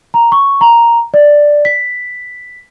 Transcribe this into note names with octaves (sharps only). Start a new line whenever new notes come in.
A#5
C#6
A#5
D5
B6